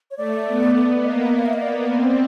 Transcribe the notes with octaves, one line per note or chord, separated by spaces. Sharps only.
C#5
A3 D5
B3
B3 D5
A#3 D#5
F5
E5
D#5
B3 D5
C4